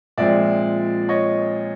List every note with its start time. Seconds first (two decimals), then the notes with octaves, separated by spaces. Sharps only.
0.18 A#2 F3 G#3 C4 D5 E5
1.09 C#5 D#5